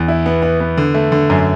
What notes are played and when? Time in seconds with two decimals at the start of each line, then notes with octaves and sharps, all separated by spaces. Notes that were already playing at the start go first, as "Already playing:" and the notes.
Already playing: E2
0.08 E4
0.26 B3
0.43 B3
0.60 B3
0.78 D3
0.94 A3
1.12 D3
1.30 F#2